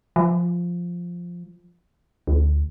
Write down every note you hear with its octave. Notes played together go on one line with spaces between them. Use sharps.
F3
D2